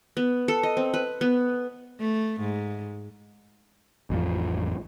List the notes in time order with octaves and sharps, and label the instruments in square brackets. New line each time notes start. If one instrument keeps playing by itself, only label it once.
[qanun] B3
A4
D#5
C4
B4
B3
[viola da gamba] A3
G#2
[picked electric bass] A1 F2 F3